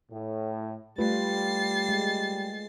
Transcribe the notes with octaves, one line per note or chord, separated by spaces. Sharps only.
A2
G3 A3 F4 B4 A6 C7
G#3